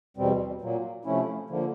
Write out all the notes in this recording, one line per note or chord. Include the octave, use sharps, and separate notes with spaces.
E2 B2 G3 C4
A#2 F#3 A#3
C3 F3 A3 C#4 E4
D3 F3 A#3